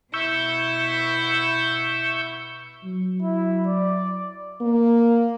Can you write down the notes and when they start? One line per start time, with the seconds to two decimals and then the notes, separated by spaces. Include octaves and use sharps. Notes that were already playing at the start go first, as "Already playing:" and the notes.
0.14 B2 E4 C#6 E6 G6
2.84 F#3
3.22 E4
3.67 D5
4.61 A#3